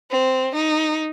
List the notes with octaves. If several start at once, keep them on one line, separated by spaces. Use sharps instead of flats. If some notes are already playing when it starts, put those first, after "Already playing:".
C4
D#4